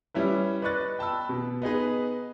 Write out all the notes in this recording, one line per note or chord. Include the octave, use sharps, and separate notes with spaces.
G3 C#4 E4 B4
B4 D5 D#5 C#6 F#6 A6
G5 A5 B5 E6
B2
B3 D#4 G#4 B4